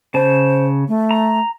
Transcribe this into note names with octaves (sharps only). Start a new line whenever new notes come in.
C#3 C5 A5
A3
A#5